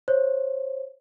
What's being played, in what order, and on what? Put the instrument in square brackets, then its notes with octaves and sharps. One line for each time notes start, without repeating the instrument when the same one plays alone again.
[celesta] C5 C#5